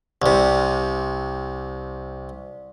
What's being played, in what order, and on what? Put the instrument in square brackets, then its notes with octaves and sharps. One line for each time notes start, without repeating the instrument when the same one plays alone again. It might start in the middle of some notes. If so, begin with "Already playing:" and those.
[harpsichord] C2 C3